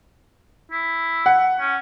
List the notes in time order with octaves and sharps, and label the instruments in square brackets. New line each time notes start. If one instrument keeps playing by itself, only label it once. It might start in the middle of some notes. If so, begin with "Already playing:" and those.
[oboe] E4
[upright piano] F#5
[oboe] C#4